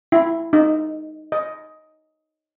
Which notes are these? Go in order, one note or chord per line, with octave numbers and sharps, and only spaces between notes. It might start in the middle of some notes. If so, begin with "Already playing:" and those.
E4
D#4
D#5